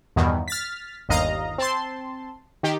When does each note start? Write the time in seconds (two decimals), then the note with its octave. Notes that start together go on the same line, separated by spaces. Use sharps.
0.16 E2 G2 B2 D#3
0.48 F6 A6 B6
1.09 G1 D#2 D#5 F5 A#5
1.58 C4 A5 C6
2.63 D#3 G4